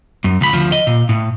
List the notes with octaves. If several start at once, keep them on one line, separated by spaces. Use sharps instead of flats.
F#2
C#2 B5
D2 F3
D#5
A#2
A2